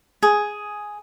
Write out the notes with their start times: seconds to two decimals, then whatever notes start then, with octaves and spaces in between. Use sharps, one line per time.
0.23 G#4